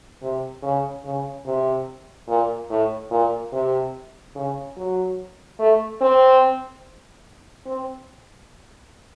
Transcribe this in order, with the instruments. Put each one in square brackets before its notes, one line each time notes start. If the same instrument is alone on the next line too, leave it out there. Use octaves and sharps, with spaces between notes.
[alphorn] C3
C#3
C#3
C3
A#2
A2
A#2
C3
C#3
F#3
A3
C4
C4